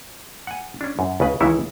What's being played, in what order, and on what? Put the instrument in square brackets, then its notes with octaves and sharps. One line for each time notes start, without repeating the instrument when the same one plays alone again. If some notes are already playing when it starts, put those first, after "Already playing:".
[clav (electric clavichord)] F#5 G#5
C#4 D4
F#2
C#2 C#3 B4
C#2 D#3 E3 E4 C#5 E5